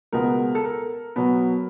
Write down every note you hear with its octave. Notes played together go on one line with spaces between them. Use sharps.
C#2 B2 G#3 B3 A#4
A4
A#4
B2 F#3 B3